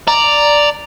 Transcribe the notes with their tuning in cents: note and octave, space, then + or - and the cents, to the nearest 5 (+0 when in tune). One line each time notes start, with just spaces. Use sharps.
D5 +0 A#5 -5